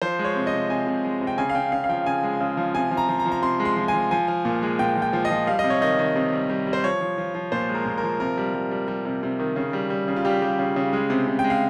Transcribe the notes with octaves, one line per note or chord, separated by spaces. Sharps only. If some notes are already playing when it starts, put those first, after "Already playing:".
F3 C5
G#3
C#5
C3
D#5
C3
C3 G#5
C3
G#3
C3
G5
C#3 G#5
F5
C#3 G5
C#3 F5
F5
F3 G5
C#3 G#5
G#3
C#3
F3
C3 G#5
F3
A#5
F3
A#5
F3
A#5
C3 C6
G#3
C6
F3
G#5
F3
F3 G#5
F3
A#2
G#3
A#2 G5
F3
G5
F3
D#5
F3
G3 F5
D#5
C3
C#5
D#3 D#5
D#3
C3
G3
G3
G3
C5
F3 C#5
F3
F3
F3
A#2 C5
G#3
A#4
A#2
A#4
F3
C3 A#4
G3
G3
G3
G3
C3
C3
D#3
C#3
G3
G3
C#3
F4
G3 G4
G3
C#3
C#3
G#3
C3
C3
G5
G#3
F5